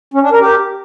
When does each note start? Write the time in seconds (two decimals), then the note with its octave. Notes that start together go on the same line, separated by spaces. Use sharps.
0.14 C#4
0.23 D4
0.32 A#4
0.41 G4